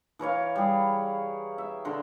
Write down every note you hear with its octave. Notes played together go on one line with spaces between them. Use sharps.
E3 A#4 C#5 F5
G3 G#4
E5
D3 A#4 C6